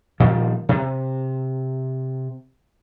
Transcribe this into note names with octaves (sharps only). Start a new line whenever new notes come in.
A#2 D#3 F3 G3
C3